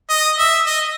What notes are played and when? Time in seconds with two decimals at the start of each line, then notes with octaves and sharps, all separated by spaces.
0.10 D#5
0.38 E5
0.67 D#5